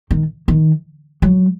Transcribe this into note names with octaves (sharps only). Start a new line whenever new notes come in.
D#3
D#3
F#3